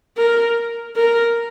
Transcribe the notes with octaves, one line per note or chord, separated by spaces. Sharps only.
A#4
A#4